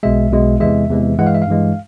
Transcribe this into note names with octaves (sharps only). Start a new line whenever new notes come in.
B1 B2 G#3 E5
B1 B2 G#3
E2 C3 E3 G#3 E5
E2 C3 E3 G#3
G2 E3 G#3 F#5
F5
E5
F5
G2 E3 G#3